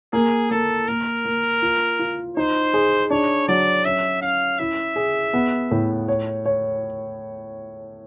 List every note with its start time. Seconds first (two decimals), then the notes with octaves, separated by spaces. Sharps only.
0.13 A#3 G#4
0.51 A#3 A4
0.88 A#3 A#4
1.25 A#3
1.62 F4
1.99 F4
2.37 D#4 C5
2.74 G#4
3.10 D4 C#5
3.48 F#3 D5
3.84 C#4 E5
4.22 C#4 F5
4.59 E4 E5
4.96 G#4
5.33 B3
5.71 A2
6.08 C#5
6.46 C#5